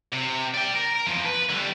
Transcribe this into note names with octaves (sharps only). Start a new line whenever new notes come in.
C3
D5 G5
A#4
E2 F3
B4
D3 G3